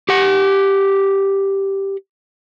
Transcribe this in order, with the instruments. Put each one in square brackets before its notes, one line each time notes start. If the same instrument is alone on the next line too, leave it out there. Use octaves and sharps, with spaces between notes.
[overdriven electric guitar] G4 F#5